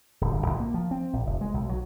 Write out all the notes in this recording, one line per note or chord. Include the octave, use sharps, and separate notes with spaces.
D1
G1
A#1
A#3
F3
C4
A#1
F1
G#3
B1
F#3